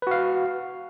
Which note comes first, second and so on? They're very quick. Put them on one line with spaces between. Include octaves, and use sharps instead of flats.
B4 F#4 F5